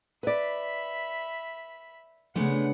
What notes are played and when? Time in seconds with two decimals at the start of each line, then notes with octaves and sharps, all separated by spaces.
0.23 B4 D5 E5 B5
2.36 C#3 G#3 A3 B3 D4 F#5